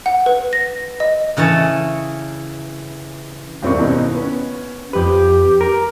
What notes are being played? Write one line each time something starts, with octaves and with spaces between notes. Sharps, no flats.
F#5
B4
A#6
D#5
C#3 E3 C#5 A5
D#1 C2 C4 A#4 D5 C#6
G#2 B2 D#3 C#4 D#4 E4
B3 C#4
F2 G4 B4
A#4